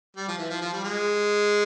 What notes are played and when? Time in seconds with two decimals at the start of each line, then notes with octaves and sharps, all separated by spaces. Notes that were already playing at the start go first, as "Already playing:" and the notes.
0.16 G3
0.28 F3
0.38 E3
0.50 F3
0.61 F3
0.73 G3
0.84 G#3